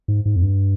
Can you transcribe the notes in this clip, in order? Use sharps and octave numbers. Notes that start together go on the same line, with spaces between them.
G#2
G#2
F2
G2